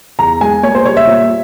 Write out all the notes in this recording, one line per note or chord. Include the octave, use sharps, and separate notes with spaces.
E2 A#5
G#3 G#5
A#3 C#5
C5
G3 C#5
E5
A#2